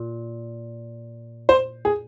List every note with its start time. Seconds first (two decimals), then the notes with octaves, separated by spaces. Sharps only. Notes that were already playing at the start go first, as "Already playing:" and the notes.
Already playing: A#2
1.49 C5
1.85 G#4